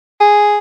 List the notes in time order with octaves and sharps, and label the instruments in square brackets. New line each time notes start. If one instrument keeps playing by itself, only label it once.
[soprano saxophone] G#4